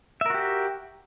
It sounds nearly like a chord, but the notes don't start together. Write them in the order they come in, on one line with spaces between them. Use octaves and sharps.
E5 A#4 F#4 G4